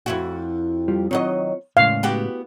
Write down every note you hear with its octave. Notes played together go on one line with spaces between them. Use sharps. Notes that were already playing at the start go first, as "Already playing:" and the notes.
F2 E4 F#4
G3 F4 G4
D#3 F#3 C4 F4 C#5 D#5
E2 A2 C#3 G#3 F5
B3 F#4 G4